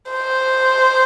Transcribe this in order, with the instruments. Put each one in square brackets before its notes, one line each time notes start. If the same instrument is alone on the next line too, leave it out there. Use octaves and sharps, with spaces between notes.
[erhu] C5